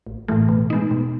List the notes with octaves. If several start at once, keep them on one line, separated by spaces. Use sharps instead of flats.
A1
A2 E3 A3
B2
G#3 B3 D#4
B2